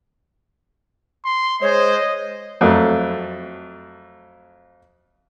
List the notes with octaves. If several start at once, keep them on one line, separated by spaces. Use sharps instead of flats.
C6
G#3 C5 C#5 D#5
F2 F#3 A3